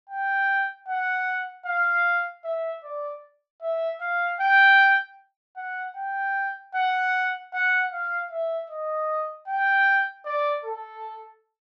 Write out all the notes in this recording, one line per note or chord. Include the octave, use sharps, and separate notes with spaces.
G5
F#5
F5
E5
D5
E5
F5
G5
F#5
G5
F#5
F#5
F5
E5
D#5
G5
D5
A4